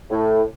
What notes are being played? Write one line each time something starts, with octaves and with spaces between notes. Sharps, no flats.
A2